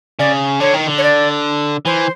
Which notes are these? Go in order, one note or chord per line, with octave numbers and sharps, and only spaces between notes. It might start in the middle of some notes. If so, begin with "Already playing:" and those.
C#3 D5
D3 C#5
D#3
D3
C#5
D5
E3 C5